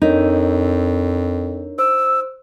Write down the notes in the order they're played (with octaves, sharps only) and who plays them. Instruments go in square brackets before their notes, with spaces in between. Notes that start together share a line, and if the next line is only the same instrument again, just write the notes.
[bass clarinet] F2 [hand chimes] D4 A#4 C#5 [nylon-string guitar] D#4
[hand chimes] C5 [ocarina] E6